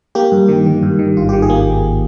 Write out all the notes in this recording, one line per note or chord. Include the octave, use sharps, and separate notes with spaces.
A#3 G4
G2
D#3
D#3
G2
D#3
G#1 F4
D#3 G4
G#4
A#3